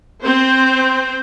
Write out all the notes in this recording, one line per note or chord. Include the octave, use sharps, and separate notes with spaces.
C4 C5